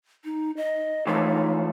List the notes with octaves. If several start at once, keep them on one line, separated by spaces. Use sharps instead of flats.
D#4
D#5
E3 F3 A3 D#4